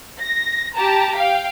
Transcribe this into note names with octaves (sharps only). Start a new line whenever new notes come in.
A#6
G4 A5 A#5
F5 G5